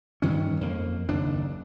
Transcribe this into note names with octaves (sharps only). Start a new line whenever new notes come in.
G2 D#3 C#4
F2 A#3
F#1 D#2 D4